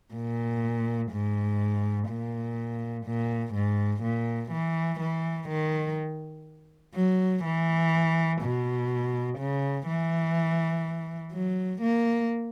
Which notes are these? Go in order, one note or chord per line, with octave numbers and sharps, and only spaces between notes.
A#2
G#2
A#2
A#2
G#2
A#2
E3
E3
D#3
F#3
E3
B2
C#3
E3
F#3
A#3